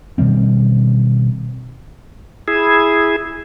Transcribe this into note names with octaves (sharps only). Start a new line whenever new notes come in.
B2 D#3 G3 C4
E4 G#4